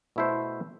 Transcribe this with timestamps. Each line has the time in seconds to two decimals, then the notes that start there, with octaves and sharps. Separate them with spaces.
0.16 B2 A3 E4 A4 C5